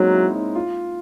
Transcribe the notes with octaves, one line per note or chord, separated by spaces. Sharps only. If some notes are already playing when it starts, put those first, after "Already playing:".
Already playing: F#3 G#3 A#3 C4 C#4 D#4
E4
D#4
F4